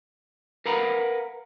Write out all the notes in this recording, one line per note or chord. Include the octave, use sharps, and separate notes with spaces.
A#4 B4 F5 F#5 A#5 B5